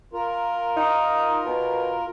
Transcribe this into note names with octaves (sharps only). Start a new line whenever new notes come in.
F4 A#4
D#4
B2